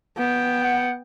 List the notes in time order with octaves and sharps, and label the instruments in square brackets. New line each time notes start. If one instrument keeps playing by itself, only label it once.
[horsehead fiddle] B3 G5
[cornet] F#5